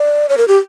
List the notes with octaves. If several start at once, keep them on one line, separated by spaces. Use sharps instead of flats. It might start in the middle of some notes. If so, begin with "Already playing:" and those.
Already playing: D5
C#5
A#4
G4